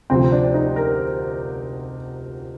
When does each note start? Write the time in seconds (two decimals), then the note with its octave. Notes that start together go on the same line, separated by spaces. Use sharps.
0.10 D2 C3 F3 C4
0.32 D4
0.54 D#4
0.76 A#4